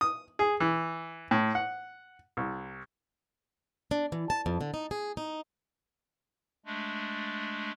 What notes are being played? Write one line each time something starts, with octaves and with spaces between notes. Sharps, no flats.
D#6
G#4
E3
A2
F#5
C2
D4
E3
A5
F2
D3
D#4
G#4
D#4
G#3 A3 D4